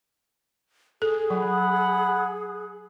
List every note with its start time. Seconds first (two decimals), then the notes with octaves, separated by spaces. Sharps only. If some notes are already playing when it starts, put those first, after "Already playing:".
1.02 G#4 A4
1.30 F#3 F#5 B5